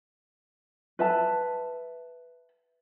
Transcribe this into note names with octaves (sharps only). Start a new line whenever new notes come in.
B4 E5 A5